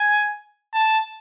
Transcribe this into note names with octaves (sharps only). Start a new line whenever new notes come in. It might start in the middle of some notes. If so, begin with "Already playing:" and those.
Already playing: G#5
A5